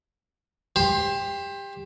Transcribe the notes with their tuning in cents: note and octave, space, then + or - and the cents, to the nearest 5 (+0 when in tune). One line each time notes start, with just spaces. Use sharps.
G4 +20 C5 +20 C6 +0